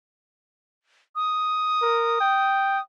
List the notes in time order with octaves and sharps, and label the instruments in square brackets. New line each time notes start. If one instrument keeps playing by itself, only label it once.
[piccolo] D#6
[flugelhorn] A#4
G5